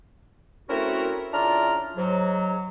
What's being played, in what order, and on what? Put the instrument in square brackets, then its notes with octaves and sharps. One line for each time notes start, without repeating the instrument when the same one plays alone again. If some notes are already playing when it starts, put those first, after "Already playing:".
[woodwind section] A3 C4 C#4 E4 F#4 A#4
C#3 D4 E4 F4 A#5 F6
G#2 F#3